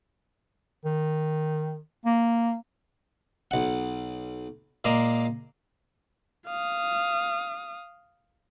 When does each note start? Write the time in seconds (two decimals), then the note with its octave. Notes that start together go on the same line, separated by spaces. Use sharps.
0.85 D#3
2.05 A#3
3.51 B1 F#5
4.85 A#2 G#3 A#3 A#5 D6
6.47 F5 D#6